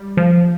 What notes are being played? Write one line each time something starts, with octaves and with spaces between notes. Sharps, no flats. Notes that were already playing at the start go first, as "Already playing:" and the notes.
Already playing: G3
F3